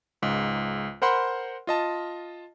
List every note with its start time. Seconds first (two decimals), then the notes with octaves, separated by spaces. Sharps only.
0.22 C#2 G#2
1.02 A#4 C5 F#5 B5 C6
1.67 F4 D#5 A5